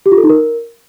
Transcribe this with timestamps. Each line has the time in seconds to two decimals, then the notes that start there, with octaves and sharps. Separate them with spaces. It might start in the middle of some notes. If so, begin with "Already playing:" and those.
0.06 G4
0.12 F4
0.18 A4
0.23 D#4
0.29 A#4